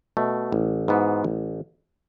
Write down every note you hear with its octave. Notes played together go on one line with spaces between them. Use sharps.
B2 A3
A1
G#2 E3 B3 F#4
A1